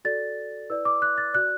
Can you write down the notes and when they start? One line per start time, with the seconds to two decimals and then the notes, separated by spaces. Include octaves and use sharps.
0.05 F#4 A4 D5 A6
0.70 E4 B4 D5 E6
0.85 D6
1.02 F#6
1.18 A6
1.33 F#4 D5 F#6